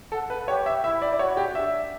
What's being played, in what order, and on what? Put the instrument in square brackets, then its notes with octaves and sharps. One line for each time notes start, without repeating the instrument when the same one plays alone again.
[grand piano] A4 [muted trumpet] F#5
[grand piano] B4
[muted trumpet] G4 [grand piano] C#5
[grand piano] E5
[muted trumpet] E4 [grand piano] E5
[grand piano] D5
D5
[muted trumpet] F#4 [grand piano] C#5
[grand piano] G4
[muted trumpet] D4 [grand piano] E5